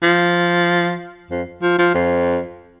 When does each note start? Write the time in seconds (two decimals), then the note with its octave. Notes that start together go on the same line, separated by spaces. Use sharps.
0.03 F3
1.30 F2
1.62 F3
1.78 F3
1.94 F2